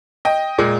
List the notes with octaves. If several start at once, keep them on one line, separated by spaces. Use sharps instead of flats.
D#5 G5
A#2 G#3